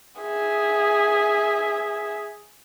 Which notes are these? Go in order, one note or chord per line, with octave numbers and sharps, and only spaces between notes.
G#4 E5